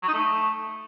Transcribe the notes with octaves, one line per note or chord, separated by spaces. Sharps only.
F#3
D#4
A3